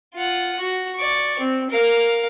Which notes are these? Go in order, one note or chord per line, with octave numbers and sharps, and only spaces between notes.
F4 F#5
F#4
D5 C#6
C4
A#4 F5